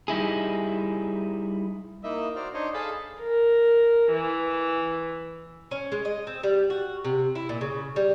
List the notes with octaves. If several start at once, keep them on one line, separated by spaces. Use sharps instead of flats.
G3 D#4 E4 G#4
A#3 D#4 E4 D#5 E5
F#4 C5 D5 A#5 F6
D4 D#4 C5 C#5 D#5
G#4 A4 D#5 F5 A5 B5
A#4
E3
C#4
G#3
D#5
C4
G3
F#4
C3
E4
A#2
C#3
G3